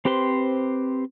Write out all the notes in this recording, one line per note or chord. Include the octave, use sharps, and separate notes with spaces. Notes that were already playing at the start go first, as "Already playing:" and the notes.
C4 G4 B4 C5 C6